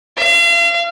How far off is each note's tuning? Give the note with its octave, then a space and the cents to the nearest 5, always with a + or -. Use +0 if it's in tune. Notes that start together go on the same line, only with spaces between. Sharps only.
F5 -40